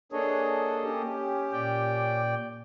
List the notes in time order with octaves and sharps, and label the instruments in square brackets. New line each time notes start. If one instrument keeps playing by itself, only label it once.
[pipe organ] A#3 A4 D#5 [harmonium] D4 G#4 C#5
[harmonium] C#4 G4
[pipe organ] A#2 D5 G5